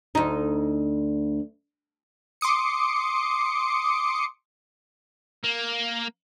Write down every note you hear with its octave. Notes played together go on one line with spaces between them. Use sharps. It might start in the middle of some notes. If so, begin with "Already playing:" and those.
D2 D#4
C6 D6 D#6 C#7
A#3